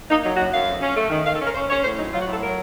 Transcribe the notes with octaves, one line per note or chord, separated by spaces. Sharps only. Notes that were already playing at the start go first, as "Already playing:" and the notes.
A#3 D#4
F#3 D#4
F#2 F#4
F#2 F5
F2
C#4
A3
D#3
D#3 F5
A4
C#4 A#4
C#4 C5
C#4 C#5
A2 C5
F#3 D#4
F#3 F4
F#4
A2 A4
F#3 A#4